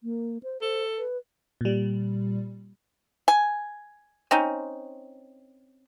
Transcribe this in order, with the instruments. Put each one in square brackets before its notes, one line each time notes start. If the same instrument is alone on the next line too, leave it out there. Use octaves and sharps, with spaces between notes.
[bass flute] A#3
C5
[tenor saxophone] A4 [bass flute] C5
[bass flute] B4
[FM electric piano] A#2 G3
[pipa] G#5
C4 C#4 D#4